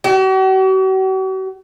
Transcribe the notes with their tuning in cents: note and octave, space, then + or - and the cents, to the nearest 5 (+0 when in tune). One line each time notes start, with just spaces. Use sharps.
F#4 +45